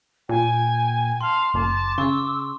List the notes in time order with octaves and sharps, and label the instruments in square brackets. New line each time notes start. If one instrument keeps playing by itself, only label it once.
[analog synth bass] A#2 [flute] G5 [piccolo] G#5
[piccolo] F5 [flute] A5 [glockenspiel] C6
[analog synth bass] F#1 [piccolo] A5 [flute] D6
[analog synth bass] C#3 [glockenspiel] C#6 [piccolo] E6